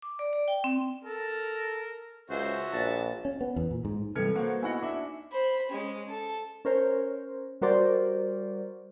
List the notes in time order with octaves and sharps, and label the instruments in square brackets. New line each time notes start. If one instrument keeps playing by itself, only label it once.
[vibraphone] D6
D5
D5
G5
C4
[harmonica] A4 [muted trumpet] A#4
[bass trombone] C#2 [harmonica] C#4 F#4 E5 [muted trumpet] C5
[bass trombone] A#1 [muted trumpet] A5
[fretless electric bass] C#4
B3
E2
A#2
G#2
[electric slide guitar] C3 E3 G3 [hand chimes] A4 B4 [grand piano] F6 G#6 C#7
[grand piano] A#3 F#4 C5 [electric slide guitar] F#5
[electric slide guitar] B3 D#5 [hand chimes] D#4 G#5 [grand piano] E4 F#4 F#5
[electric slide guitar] D4 E5 [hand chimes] D6
[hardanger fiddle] C5 B5
G#3 C#4
A4
[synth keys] C#4 A#4 C5 C#5
G3 F#4 A#4 C5 D5